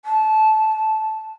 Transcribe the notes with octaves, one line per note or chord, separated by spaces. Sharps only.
A5